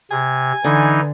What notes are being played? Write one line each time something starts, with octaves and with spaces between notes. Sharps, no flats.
C3 G#5
D3 E3 D#4